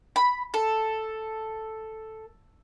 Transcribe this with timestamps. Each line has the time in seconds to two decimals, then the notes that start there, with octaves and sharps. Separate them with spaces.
0.16 B5
0.54 A4